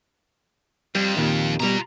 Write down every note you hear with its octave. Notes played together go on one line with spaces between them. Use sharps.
F2 G3
D#2 A#2 D#3
B2 G3 F4 A#5